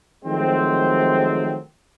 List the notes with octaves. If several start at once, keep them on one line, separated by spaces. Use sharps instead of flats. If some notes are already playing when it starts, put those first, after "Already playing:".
D#3 F3 F#3 G#3 A3 C4